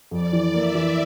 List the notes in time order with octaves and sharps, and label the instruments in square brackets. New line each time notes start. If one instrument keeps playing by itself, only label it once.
[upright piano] F2 [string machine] D5
[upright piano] E3
[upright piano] A#3 [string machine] E5
[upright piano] E3